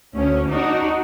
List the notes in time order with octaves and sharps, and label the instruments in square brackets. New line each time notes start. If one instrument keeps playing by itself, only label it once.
[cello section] D2 C#4
D4 D#4 F#4